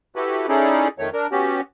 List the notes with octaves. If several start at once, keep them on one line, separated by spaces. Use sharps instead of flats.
E4 F#4 G4 A4 B4
C#4 D#4 E4 G#4 A4 D5
F2 D#3 A3 C#5
D4 A#4
B3 C#4 F#4 G4